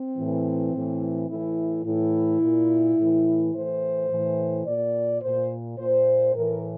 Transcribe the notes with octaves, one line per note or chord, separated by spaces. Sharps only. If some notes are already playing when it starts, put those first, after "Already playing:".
Already playing: C4
A2 E3
A2 E3
A2 E3 E4
A2 E3 E4
A#2
A2 E3
A2 E3 C5
A2 E3
A#2 D5
A#2 C5
A#2 C5
A2 E3 A#4